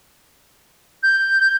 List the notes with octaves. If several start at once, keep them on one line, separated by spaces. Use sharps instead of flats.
G6